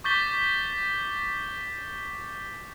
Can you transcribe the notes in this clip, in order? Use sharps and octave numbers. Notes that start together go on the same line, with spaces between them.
C#6 D6 G6 A6 B6 G7